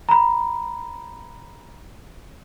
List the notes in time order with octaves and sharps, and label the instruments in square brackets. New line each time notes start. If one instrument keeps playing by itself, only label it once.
[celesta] A#5 B5